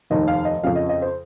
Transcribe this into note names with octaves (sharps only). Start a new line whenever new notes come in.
F1 D#2 D#3 D#5
F5
D#5
F2 C#3 F3 F5
D#5
D#5
C5